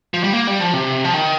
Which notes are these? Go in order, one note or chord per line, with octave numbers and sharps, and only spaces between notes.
F3
G3
A#3
G3
F3
C3
F3
D#3